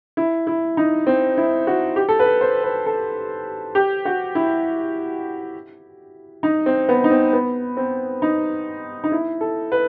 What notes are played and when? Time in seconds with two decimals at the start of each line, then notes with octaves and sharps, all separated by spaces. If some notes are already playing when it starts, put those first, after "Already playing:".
0.17 E4
0.47 E4
0.77 D#4
1.07 C4
1.37 E4
1.67 F#4
1.96 G4
2.09 A4
2.19 B4
2.41 C5
2.64 B4
2.86 A4
3.75 G4
4.05 F#4
4.35 E4
6.43 D#4
6.66 C4
6.89 B3
7.04 D#4
7.10 C4
7.33 B3
7.77 C4
8.22 D#4
9.04 D#4
9.12 E4
9.41 A4
9.72 B4